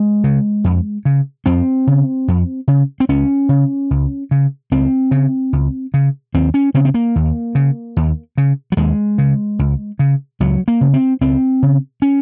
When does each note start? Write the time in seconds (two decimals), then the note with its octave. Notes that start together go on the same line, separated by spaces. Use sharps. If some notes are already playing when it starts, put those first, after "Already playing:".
Already playing: G#3
0.24 C#3
0.64 F2
1.05 C#3
1.46 F2 C4
1.87 C#3
2.28 F2
2.68 C#3
3.00 C4
3.09 C#2 C#4
3.49 C#3
3.91 C#2
4.31 C#3
4.71 C#2 C4
5.11 C#3
5.53 C#2
5.94 C#3
6.34 D#2 C4
6.54 C#4
6.74 C#3 C4
6.85 C4
6.94 A#3
7.16 D#2
7.55 C#3
7.97 D#2
8.38 C#3
8.72 F#3
8.77 D#2 G#3
9.18 C#3
9.59 C#2
9.99 C#3
10.40 C#2 F#3
10.68 A#3
10.81 C#3
10.94 C4
11.21 C#2 C4
11.63 C#3
12.02 C#4